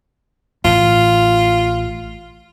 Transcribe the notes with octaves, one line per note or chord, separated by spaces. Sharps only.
A1 F4